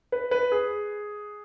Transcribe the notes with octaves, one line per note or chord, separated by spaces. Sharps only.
B4
B4
G#4